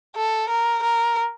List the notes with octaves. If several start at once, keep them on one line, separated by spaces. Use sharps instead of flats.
A4
A#4
A#4